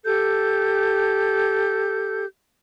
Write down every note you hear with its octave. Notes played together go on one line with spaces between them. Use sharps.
G4 A4 G6